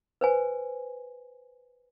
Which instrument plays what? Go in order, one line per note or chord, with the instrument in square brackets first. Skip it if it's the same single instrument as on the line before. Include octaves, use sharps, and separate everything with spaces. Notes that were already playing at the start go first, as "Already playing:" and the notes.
[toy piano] B4 C5 G#5